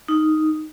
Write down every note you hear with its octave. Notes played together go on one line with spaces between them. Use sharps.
D#4